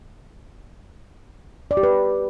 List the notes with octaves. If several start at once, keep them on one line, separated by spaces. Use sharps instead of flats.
D5
G4
B4